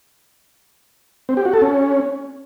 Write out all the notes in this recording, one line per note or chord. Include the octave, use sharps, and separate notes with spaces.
C4
G4
F#4
A4
C#4